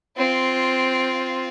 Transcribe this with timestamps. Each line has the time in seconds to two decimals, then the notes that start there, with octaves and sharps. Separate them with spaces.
0.17 C4 F4